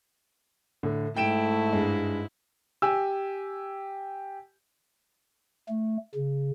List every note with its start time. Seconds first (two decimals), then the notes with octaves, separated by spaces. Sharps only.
0.83 A2 D3
1.16 G#2 A3 E4 G5 D7 E7
1.73 G2 G#3
2.82 G4 G#5 E6
5.69 A3
6.15 C#3